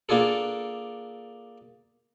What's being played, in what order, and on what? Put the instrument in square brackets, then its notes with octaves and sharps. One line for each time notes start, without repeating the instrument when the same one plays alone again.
[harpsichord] A#3 D4 F4 G#4 A4